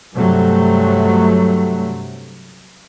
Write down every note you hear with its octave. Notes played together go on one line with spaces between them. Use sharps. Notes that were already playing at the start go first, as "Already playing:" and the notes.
G2 C3 F#3 A3